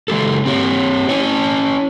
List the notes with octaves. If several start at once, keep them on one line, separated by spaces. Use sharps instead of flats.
C#3 G#3 G4 A4
C4 G4 C#5
C#4 E4 C#5